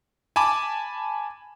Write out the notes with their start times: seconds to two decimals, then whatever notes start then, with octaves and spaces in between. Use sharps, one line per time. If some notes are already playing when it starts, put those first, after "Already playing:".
0.36 G#5 A5 B5 D6